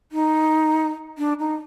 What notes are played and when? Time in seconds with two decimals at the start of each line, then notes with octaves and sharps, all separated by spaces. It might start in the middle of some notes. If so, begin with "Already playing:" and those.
0.12 D#4
1.18 D4
1.39 D#4